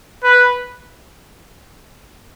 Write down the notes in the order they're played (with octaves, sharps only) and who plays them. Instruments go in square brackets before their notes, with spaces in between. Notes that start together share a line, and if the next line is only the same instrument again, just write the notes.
[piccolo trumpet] B4